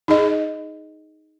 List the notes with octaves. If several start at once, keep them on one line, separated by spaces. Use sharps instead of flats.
D#4 G#4 D#5